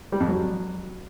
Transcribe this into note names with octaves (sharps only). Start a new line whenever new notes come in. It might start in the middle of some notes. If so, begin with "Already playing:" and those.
G3
F2
F#3